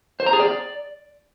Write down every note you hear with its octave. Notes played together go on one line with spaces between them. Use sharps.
C5
A#5
G#4
D5